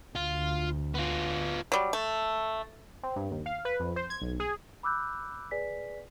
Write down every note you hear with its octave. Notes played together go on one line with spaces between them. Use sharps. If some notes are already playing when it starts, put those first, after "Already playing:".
D2 F4
B3 F4
F#3 G3
A3
C4
G2
D#2
F5
B4
F2
C5
G#6
B1
G#4
B5 D6 E6 F#6 G6
G#4 B4 D5 G#5 B6